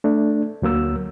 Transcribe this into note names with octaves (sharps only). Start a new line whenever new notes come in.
A3 D4
D2 F#3 A#3 E6